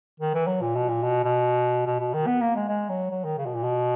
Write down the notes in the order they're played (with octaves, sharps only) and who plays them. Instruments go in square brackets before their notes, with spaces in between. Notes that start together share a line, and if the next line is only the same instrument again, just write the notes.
[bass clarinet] D#3
E3
F#3
A#2
B2
A#2
B2
B2
B2
B2
D#3
B3
A#3
G#3
G#3
F#3
F#3
D#3
C#3
B2
A#2
B2